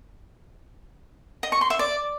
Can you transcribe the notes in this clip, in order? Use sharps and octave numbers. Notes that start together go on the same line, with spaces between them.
D#5
C#6
C6
E5
D5